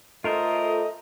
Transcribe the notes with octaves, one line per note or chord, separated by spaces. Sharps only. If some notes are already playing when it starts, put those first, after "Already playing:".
A3 F4 A4 A#4 C5 D#5